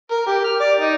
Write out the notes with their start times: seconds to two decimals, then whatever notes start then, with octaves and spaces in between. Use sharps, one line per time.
0.11 A#4
0.27 G4
0.44 F6
0.60 D5
0.80 D#4